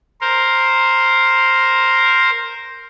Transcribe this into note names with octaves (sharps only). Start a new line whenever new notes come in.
A#4 C5